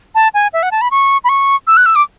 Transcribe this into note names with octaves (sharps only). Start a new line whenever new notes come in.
A5
G#5
E5
F#5
A5
B5
C#6
B5
C#6
E6
F#6
E6
D6